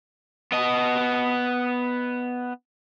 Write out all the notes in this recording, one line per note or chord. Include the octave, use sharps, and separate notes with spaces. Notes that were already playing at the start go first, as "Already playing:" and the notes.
B3 D#5